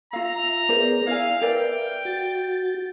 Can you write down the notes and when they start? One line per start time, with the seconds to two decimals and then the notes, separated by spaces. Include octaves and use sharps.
0.13 F4 E5 F5 A#5
0.69 B3 G#4 A#4 C5 D5
1.07 E4 E5 F5 G#5
1.41 A#4 B4 D5 G5
2.05 F#4 A6